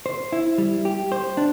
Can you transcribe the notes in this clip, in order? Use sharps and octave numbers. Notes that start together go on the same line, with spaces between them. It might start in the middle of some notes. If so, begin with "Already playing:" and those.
C5
E4
G3
G4
C5
D4